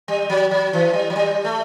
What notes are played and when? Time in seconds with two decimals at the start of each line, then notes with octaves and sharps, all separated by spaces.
0.08 G3
0.30 F#3
0.51 F#3
0.73 E3
0.94 G3
1.10 F#3
1.16 G3
1.44 A3